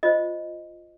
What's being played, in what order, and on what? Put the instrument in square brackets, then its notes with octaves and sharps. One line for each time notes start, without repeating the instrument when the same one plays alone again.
[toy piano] F4 C5 D#5